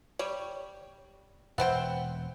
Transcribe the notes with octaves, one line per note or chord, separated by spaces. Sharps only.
G3 C#5
E1 B3 C4 C5 E5 F#5 G5